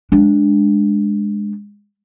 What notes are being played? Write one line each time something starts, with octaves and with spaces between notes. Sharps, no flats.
G#3 D4